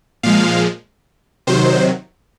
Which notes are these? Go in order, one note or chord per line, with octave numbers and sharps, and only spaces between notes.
A#2 F3 G#3 F5
C3 D#3 F#3 C5